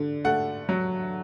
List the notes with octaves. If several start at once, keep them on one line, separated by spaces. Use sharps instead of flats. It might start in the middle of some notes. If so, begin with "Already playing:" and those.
Already playing: D3
A3 F#5
F#3